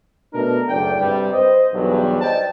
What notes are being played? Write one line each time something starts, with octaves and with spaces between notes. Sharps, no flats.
B2 A3 D4 A#4
F#1 D2 D5 G5
G2 C3 G3
C5 D#5
B1 E2 G2 F#3 G3
C5 D5 D#5 G5 A5